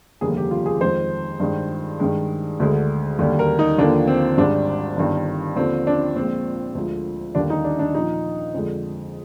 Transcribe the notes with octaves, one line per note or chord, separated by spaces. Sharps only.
F1 D#2 D3 G3 A#3 G#4
G4
F4
G#4
F2 D#3 G#3 C5
G2 D#3 G#3
G2 D#3 G#3
D2 D3 G#3
D#2 D3 G3
A#4
D#4
D#2 D3 F3 A#3 D4
C4
G#1 G#2 G3 D4
G1 G2 D#3
D#2 D3 F3 C4
D4
A#1 A#2 G#3 C4
D2 D3 F3 G#3
D#2 D3 G3 A#3 D4
D#4
D4
D4
A#1 A#2 F3 D#4
F2 D3 G#3